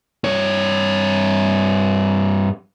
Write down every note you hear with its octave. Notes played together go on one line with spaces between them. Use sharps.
G2 C#5